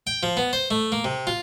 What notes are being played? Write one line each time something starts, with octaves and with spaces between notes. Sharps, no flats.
G5
F3
B3
C5
A3
A#3
C3
F4